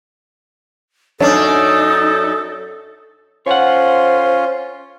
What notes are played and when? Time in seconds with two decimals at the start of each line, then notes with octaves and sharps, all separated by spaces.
1.20 F#2 D4 D#4 A4 C#5 F6
3.46 C#4 F4 C5 C#5 F#5